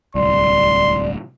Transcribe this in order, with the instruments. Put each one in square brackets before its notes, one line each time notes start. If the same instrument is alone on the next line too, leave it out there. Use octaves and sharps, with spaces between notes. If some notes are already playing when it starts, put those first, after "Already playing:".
[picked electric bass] D1 C2 [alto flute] D5 [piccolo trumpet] C6